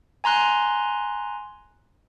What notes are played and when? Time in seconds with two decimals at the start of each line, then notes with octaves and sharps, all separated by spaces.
0.24 G#5 A#5 C6 F#6